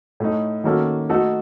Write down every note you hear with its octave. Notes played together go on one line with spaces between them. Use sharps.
A2 A3 D#4
D#3 A#3 C#4 F#4 A4
A3 D#4 F#4 A4